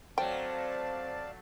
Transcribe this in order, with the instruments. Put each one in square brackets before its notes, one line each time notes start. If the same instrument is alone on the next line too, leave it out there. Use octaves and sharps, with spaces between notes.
[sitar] F#3 A3 [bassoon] C4 [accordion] D5 F5 A5 [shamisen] G5